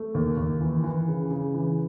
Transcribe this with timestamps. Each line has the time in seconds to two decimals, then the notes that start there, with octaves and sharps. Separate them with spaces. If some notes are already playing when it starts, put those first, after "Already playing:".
Already playing: A3
0.14 D#2
0.37 D#2
0.61 E3
0.84 E3
1.08 C#3
1.31 C#3
1.54 E3